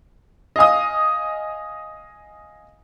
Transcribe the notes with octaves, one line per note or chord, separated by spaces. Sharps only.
D#5 F5 G#5 D#6